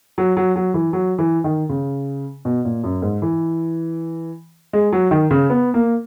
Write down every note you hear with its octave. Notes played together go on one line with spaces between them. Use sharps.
F#3
F#3
F#3
E3
F#3
E3
D#3
C#3
B2
A#2
F#2
G#2
E3
G#3
F#3
D#3
C#3
B3
A#3